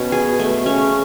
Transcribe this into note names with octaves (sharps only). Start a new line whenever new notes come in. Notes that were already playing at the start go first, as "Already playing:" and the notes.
Already playing: B2 C#4
G#4
A3
C#3 C#4